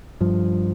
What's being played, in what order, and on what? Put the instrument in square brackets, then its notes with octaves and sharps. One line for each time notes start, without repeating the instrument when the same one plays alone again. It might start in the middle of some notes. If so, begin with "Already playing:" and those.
[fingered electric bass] G2 F3